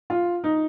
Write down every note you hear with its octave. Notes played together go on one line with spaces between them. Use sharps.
F4
D#4